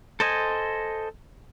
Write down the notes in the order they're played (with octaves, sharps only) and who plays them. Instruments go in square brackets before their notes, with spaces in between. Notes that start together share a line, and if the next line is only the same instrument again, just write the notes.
[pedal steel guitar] A4 C5 D#5 G#5